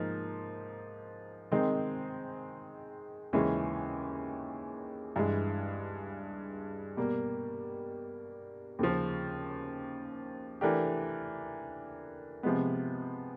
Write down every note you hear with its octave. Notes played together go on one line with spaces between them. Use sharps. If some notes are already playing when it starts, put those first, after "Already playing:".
Already playing: G#2 F3 A#3 D#4
D#3 G#3 C4 D#4
D#2 C#3 E3 G#3 C#4
G2 E3 G#3
B2 G3 A#3
D#2 C#3 F3
E3 A3 D4 G4 A#4
C3 F3 G#3 B3